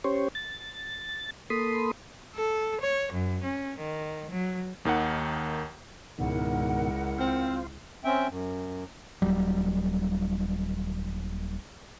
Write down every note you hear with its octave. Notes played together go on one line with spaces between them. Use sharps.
C#4 G4 C5 C#5
A6
A#3 A4 B5 C6 D#6
A4
C#5
F#2
C#4
D#3
F#3
D#2 D#3 D#4 F#5
C#2 G#2 B2 D#3 E4 A#4 F#5
C4 F4 C5 F5
C4 C#4 E5 G5
F#2
D#1 F2 F#3 G3